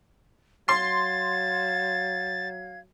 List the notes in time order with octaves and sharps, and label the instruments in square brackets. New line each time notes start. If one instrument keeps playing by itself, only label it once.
[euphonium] F#3 [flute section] F5 G#6 [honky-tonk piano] C6 C7 [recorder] A6